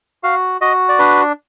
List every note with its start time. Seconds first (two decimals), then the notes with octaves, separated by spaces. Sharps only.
0.23 F#4 F5
0.61 F#4 D#5
0.89 D5
0.99 D4 B4